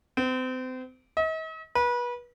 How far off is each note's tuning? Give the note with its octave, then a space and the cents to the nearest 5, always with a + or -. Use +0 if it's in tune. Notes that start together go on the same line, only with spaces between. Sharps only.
C4 -35
D#5 +45
B4 -30